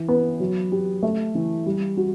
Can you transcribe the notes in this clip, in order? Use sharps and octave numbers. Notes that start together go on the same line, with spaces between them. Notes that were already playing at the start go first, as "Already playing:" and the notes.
Already playing: E3
B3
F#3
G4
A3
E3
G3
F#4